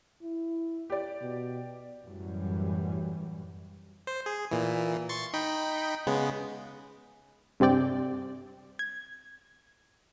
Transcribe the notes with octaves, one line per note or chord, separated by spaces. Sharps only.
E4
G4 D5
B2
F#2 A2 E3 F#3 G3
C5
G#4
A#2 E3
C6 C#6 A6
D#4 G5 B5
C#3 G#3 B3
G2 C3 C4 D5 G5
G#6